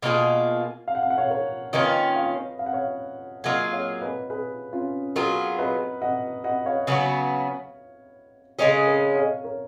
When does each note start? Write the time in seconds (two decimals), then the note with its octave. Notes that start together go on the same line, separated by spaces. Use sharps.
0.02 B2 A#3 F4 G#4
0.88 F5
0.95 F#5
1.03 F5
1.10 F#5
1.18 C#5 F5
1.30 A#4 C#5
1.73 D#3 A#3 C#4 F4 B4 D#5
2.16 C#5 F5
2.59 F5
2.66 F#5
2.73 C#5 F5
3.44 F#3 A#3 F4 G#4 D#5 F#5
3.73 C#5 F5
4.01 B4 D#5
4.30 G#4 B4
4.73 C#4 F4
5.16 F#3 B3 F4 F#4 G#4 A#4
5.59 B4 D#5
6.02 D#5 F#5
6.44 D#5 F#5
6.66 C#5 F5
6.87 C#3 F#3 B3 F#4
8.58 C#3 G#3 C#4 G#4 A#4 C#5
8.87 A#4 C#5
9.15 C#5 F5
9.44 A#4 C#5